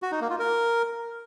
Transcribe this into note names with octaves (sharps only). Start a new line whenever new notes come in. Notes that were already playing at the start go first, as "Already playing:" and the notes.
F#4
D#4
A#3
F4
A#4